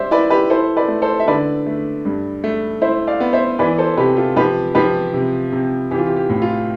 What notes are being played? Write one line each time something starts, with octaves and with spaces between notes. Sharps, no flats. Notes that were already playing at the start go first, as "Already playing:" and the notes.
Already playing: G3 C5 D5 E5
E4 B4 D5
G4 B4
E4 A4 C5
B4 D5
A3
A4 C5
E5
D3 B4 D5
A3
G2
A3
E4 C5 E5
D5 F5
B3
C5 E5
E3 B4 D5
A4 C5
C3 G4 B4
F4 A4
F3 G4 B4
F3 G4 B4
C3
C3
E3 G4
F4
G4
G4
A2
F4